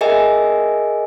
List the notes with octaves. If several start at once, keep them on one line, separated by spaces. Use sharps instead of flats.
G#4 A#4 D#5 E5 G#5